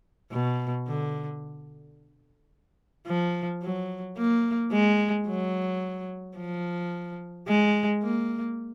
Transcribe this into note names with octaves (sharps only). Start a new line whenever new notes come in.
B2
D3
F3
F#3
A#3
G#3
F#3
F3
G#3
A#3